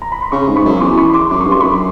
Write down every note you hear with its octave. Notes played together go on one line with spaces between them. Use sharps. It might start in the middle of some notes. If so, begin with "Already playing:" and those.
A#5
B5
C6
C#3 B5 C#6
G#2
B5 C#6
F#2
C#6
E2 C6 D6
B5 C#6
C6 D6
F#2 D6
C#6
G2 C6
F#2 B5 C#6